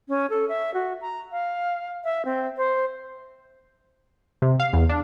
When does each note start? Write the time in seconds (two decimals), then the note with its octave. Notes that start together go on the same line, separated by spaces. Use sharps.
0.09 C#4
0.30 A4
0.49 E5
0.74 F#4
1.01 A#5
1.32 F5
2.04 E5
2.25 C4
2.57 C5
4.42 C3
4.60 F5
4.73 E2
4.89 D4